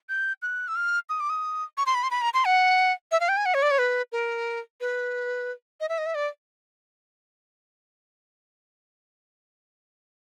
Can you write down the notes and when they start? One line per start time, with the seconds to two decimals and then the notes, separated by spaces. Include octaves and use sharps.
0.09 G6
0.42 F#6
0.68 E6
0.76 F6
1.09 D#6
1.20 D6
1.30 D#6
1.77 C#6
1.86 C6
1.94 B5
2.03 C6
2.11 B5
2.22 A#5
2.34 C6
2.45 F#5
3.11 E5
3.20 F5
3.29 G5
3.37 G#5
3.46 F#5
3.54 C#5
3.62 D5
3.71 C#5
3.78 B4
4.12 A#4
4.81 B4
5.80 D#5
5.89 E5
5.98 D#5
6.06 E5
6.15 D5